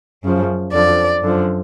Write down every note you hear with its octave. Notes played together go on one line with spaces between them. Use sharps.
F#2 C#3 F3
F2 D3 F3 D5
F#2 D3 F3